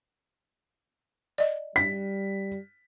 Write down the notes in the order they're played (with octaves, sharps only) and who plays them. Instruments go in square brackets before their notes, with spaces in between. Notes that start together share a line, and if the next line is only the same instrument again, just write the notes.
[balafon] D5 D#5
[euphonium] G3 [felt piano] B6